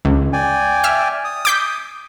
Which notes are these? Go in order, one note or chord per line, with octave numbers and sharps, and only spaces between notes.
C#2
D5 G5 G#5
E5 F6
D#6
D6 G6 B6